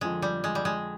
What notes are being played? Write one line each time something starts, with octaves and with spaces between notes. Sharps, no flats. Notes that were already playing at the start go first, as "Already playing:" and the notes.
F2 D3 F3 G#3
G3
G#3
G3
G#3